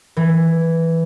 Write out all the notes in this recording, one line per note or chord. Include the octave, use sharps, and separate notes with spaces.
E3